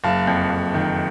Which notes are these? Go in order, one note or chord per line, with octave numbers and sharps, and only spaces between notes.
F#1 F5 A5
F2
F#1
D#3